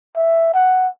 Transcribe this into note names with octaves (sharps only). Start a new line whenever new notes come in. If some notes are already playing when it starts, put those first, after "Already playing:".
E5
F#5